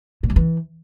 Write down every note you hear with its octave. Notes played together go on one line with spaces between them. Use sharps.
A#2
F#2
E3